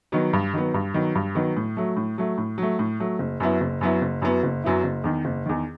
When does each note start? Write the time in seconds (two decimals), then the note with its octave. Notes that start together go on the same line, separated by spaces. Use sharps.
0.12 D#3 F#3 B3
0.33 G2
0.54 D#3 F#3 B3
0.74 G2
0.94 D#3 F#3 B3
1.15 G2
1.35 D#3 F#3 B3
1.57 A2
1.77 F#3 A3
1.97 A2
2.18 F#3 A3
2.38 A2
2.58 F#3 A3
2.79 A2
3.00 F#3 A3
3.19 F#1
3.40 F#2 F#3 B3 E4
3.61 F#1
3.81 F#2 F#3 B3 E4
4.02 F#1
4.22 F#2 F#3 B3 E4
4.43 F#1
4.64 F#2 F#3 B3 E4
4.84 F#1
5.04 E2 D#3
5.25 F#1
5.46 E2 D#3